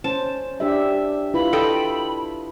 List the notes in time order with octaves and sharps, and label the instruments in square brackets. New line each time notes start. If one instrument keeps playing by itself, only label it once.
[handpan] C#4 C5 [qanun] A5
[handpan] D4 G4 E5
[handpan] E4 F4 B4 [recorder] B5
[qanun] A4 D#5 G5